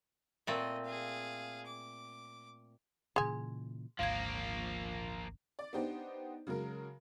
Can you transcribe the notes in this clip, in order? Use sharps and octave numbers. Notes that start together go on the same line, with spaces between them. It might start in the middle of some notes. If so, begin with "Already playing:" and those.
A#2 A3 C4 D#5
G#4 F5
D6
A#2 C#3 E3 G#4 G#5 C6 G#6
G#1 D2 G#2 F3 A#3 F5 G#6
D5
B3 D4 D#4 G4 C5
C#3 F#3 G#3 A#4